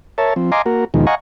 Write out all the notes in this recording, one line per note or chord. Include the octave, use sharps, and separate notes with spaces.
A#4 C#5 E5 A5
F3 C4
D#5 F5 G#5 A#5 C6 D6
A#3 F#4 A#4
D#2 B2 D#3 F3 G#3
D#5 F5 F#5 G#5 A#5 C#6